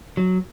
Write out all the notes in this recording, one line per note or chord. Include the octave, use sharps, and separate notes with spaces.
F#3